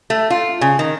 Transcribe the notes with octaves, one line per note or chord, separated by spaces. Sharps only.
A3
F4
C#3
D#3